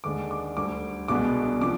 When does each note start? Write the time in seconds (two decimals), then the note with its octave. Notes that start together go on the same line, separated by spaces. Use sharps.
0.04 D#2 D3 G#3 D4 D6
0.31 D6
0.56 D2 D3 G3 D6
1.08 C2 B2 G#3 B3 D4 D6
1.61 C3 F3 D6